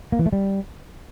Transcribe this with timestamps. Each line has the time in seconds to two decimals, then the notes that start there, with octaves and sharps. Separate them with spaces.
0.12 A#3
0.19 E3
0.26 A3
0.33 G3